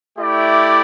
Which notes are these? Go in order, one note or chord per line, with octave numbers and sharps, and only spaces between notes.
A3 E4 G4 D5